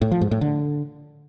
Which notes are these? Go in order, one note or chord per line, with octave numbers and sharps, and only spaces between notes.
A2
F3
G#2
A2
D3